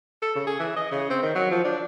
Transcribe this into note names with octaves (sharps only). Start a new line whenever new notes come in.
A4
C#3
G#4
E3
D#5
C#3
C4
D#3
F#3
F3
D4